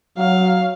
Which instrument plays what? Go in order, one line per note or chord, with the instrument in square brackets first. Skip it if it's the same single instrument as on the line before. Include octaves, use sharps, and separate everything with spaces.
[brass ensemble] F#3 [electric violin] F5